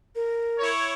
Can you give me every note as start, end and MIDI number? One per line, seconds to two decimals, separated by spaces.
0.15 0.70 70
0.59 0.94 64
0.59 0.94 73